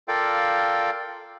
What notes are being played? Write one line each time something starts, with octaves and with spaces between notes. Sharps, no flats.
F4 A4 A#4 D5 F5 G5